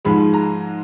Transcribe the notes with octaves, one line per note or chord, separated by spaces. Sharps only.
G#2 F3 G#3 B5
A#5